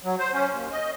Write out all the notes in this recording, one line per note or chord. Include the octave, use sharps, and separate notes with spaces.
F#3
C5
C#4
D#2
D#5